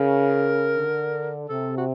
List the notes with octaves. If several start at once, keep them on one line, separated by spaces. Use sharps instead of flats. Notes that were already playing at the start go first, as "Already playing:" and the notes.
Already playing: C#3 A#4
D3
C3 A4
F#4